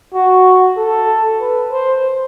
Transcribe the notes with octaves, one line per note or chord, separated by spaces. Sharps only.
F#4
A4
B4
C5